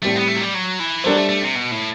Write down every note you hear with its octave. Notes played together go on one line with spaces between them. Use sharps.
A2 G3 A3 C4 G4
B3
A3
F#3
G3
F#3
E3
F#3 G3 D4 A4 C5
A3
A3
C3
B2
A2